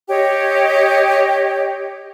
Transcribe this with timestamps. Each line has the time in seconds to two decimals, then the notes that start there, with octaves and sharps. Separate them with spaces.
0.09 G4 C#5 D#5 G5